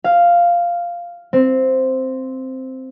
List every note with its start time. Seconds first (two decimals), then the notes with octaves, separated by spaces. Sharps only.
0.04 F5
1.33 C4